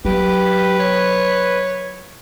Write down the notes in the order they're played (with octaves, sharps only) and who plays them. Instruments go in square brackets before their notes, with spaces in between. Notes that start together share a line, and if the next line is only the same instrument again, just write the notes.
[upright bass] F#3 [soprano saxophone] G4 [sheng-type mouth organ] B4
[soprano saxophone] C#5